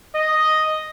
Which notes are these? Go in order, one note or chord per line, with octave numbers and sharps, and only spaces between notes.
D#5